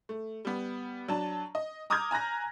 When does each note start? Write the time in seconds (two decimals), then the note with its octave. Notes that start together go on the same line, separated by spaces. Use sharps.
0.09 A3
0.45 G3 B3
1.08 F#3 D4 A5
1.55 D#5
1.90 A#5 D6 D#6 F6 G6 G#6
2.11 G#5 A#5 F#6 A#6